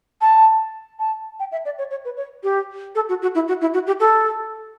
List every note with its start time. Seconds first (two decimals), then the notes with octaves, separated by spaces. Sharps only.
0.21 A5
0.99 A5
1.39 G5
1.52 E5
1.65 D5
1.78 C#5
1.91 C#5
2.05 B4
2.17 C#5
2.43 G4
2.95 A4
3.09 F#4
3.22 F#4
3.35 E4
3.48 F#4
3.61 E4
3.74 F#4
3.87 G4
4.00 A4